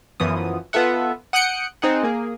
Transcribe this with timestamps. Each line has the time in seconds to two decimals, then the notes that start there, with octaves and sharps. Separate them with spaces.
0.20 F#2 E3 F3 B3 D#6
0.73 B3 F4 A4 E5 F#5
1.33 F#5 D#6 F#6 G6 C#7 D7
1.82 C4 D#4 G#4 F#5
2.03 A#3 G#4